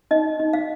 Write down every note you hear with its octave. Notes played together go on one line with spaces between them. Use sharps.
D#4 D#5
D#4
F5